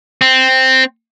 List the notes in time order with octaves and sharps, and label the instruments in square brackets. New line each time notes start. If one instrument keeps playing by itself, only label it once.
[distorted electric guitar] C4